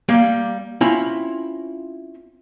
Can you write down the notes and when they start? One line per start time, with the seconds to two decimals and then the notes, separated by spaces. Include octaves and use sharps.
0.09 G3 A#3 F5
0.81 C4 C#4 E4 F4 B5